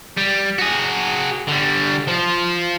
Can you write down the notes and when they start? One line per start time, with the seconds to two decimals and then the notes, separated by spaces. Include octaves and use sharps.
0.18 G3
0.59 F#4 G#4
1.48 D3 G3
2.08 F3 F4